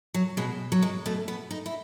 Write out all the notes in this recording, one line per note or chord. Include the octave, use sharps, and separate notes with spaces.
F#3
B2 G#3
F#3
G#3
B2 A3
B3
D#4
E4